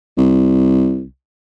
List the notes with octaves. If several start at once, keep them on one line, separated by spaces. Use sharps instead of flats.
C2